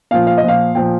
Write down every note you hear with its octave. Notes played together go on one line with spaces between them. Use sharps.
A#2 F3 F5
F5
D#5
A#2 F3
F5
A#2 F3 G5